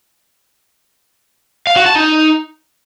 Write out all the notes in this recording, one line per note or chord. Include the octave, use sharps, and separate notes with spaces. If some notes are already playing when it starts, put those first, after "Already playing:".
F5
F#4
A5
D#4